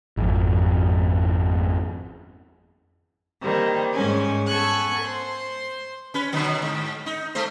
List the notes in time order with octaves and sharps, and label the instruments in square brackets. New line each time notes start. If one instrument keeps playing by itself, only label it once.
[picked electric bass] G#1 F2
[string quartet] D#3 G3 A#3 C4
G#2 G3 G#3 C#4 G#5
B3 A4 G#5 C#6 F#6
C5 C6
[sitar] C#4 B4
B2 D3 F#3
G#2
D#4
G#3 A3 C5